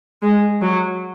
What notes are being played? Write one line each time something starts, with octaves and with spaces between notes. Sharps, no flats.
G#3
F#3